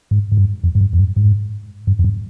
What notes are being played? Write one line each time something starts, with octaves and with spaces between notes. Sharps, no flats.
G#2
G#2
G2
F2
G#2
G2
F2
G2
G#2
G2
F2
G2